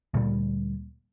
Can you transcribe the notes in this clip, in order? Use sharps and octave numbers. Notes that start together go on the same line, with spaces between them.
D2 A#2 G3